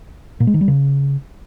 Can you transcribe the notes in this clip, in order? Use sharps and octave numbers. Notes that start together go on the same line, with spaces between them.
A#2
G#3
D#3
G3
C#3